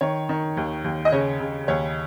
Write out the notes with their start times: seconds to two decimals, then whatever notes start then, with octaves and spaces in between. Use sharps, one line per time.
0.01 D#3 C#5
0.29 D#3
0.57 D#2
0.84 D#2
1.05 D#5
1.12 C#3 C#5
1.40 C#3
1.68 D#2 C#5